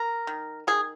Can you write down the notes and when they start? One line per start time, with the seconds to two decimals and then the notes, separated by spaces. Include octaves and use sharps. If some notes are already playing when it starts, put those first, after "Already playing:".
Already playing: A#4
0.27 D#3
0.67 D#3 G#4